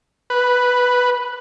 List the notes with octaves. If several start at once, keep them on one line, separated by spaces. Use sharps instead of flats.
B4